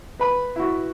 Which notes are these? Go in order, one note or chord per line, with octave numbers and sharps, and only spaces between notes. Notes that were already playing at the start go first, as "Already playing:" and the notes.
B4 B5
E4 F#4